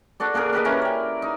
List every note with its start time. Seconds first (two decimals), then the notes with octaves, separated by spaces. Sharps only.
0.20 D4 F#4 A4 D5
0.34 A#3 D4 G#4 A#4
0.53 D4 G4 B4 D#5
0.65 C#4 E4 A#4 G#5
0.81 D5 G5
1.22 D#4